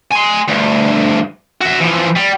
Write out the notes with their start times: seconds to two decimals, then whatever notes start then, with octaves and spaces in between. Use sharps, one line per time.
0.11 G#5 C6
0.48 D2 G2
1.61 F#4 E5
1.81 E3 F3
2.16 G3